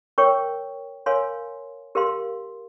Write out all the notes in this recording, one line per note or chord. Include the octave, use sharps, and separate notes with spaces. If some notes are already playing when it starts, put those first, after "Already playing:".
A#4 C#5 G5 C#6
A#4 C#5 F5 G#5 C6
G4 A#4 F5 C6